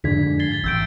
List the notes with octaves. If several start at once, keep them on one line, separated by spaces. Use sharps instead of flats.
F2 G#2 D3 G#6 B6
A6 C7 G7
G#6 A6
A1 E6 G6 D7